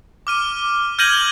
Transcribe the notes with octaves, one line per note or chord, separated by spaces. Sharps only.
D6 F6 D#7
F6 G6 G#6 A#6 D#7 F#7